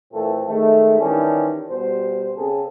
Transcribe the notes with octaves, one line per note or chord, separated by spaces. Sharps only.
A#2 E3 A3 C4 A4
D#3 G#3 A3
D#3 E3 G3 C#4 D4
B2 G3 C5
C#3 C4 C#4 G#4 A4